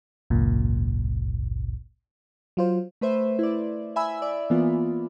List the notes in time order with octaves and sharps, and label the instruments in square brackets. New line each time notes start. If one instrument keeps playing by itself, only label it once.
[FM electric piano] G#1 C#2 F#2 A#2
F#3 F4 C5
[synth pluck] A3 B4 C5 E5
E4 D5
E5 G#5 B5 E6
D5
E3 A#3 B3 F4